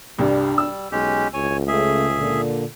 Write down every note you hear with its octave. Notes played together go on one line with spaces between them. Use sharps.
C2 G2 C3 G3 D4
E6
B1 G#3 C#4 G4
C#2 C#5 G#5
C#3 A3 G#4 E5
A#2 D3